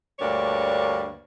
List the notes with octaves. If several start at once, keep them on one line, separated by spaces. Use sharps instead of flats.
D2 G2 A#3 D4 C#5